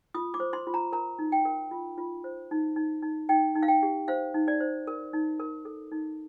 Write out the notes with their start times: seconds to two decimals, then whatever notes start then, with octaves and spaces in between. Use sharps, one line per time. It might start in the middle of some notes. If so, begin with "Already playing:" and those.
0.14 F4 D#6
0.34 D6
0.40 C5
0.53 C6
0.67 F4
0.74 A#5
0.92 A#4 A#5
1.19 D#4
1.32 G5
1.45 A#4
1.71 F4
1.98 F4
2.24 C5
2.51 D#4
2.76 D#4
3.03 D#4
3.29 D#4 G5
3.55 D#4
3.63 F5
3.68 G5
3.83 G4
4.08 C5 F5
4.34 D#4
4.48 D5
4.61 C5
4.87 A#4
5.13 D#4
5.40 A#4
5.65 A4
5.91 D#4